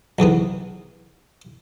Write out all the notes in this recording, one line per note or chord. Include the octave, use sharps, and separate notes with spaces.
B1 E2 C3 B3